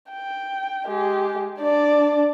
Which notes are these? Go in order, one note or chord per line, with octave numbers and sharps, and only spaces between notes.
G5
G#3 G4
D4 D5